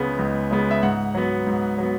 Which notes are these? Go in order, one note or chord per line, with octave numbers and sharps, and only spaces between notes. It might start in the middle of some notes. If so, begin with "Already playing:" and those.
Already playing: C#2 C#3 G#3 B3
C#2
C#3 G#3 B3
E5
G#2 F#5
F#3 B3
G#2
F#3 B3